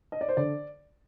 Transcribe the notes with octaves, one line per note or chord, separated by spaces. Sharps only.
D#5
D5
C5
D3 D5